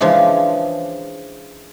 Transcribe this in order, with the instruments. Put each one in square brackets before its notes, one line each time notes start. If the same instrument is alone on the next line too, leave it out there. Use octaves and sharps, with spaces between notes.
[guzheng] C#3 E3 F3 G#3 D4